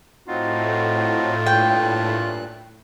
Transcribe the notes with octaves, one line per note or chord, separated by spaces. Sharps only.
A2 C4 D#4 F4 F#4
G2 A#2 G5 F#6